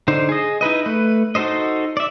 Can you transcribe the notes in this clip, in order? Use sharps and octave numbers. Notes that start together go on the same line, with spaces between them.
D3 D#4 C5
G#4 D#5
D#4 E4 B4 D#5
A3 B4
D#4 F#4 A4 C5 D#5
D5 E5